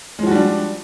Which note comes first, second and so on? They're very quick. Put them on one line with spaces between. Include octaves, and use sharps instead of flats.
G#3 F3 F#4 G3 D4